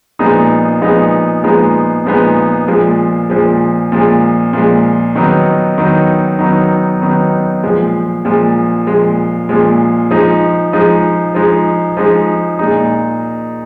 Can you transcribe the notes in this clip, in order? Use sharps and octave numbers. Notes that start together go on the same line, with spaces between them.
A#2 F3 G#3 B3 D#4
A#2 F3 G#3 B3 D#4
A#2 F3 G#3 B3 D#4
A#2 F3 G#3 B3 D#4
A#2 F3 G#3
A#2 F3 G#3
A#2 F3 G#3
A#2 F3 G#3
D#3 F#3 B3 D#4
D#3 F#3 B3 D#4
D#3 F#3 B3 D#4
D#3 F#3 B3 D#4
A#2 F3 G#3
A#2 F3 G#3
A#2 F3 G#3
A#2 F3 G#3
F3 G#3 D#4
F3 G#3 D#4
F3 G#3 D#4
F3 G#3 D#4
A#2 G#3 D#4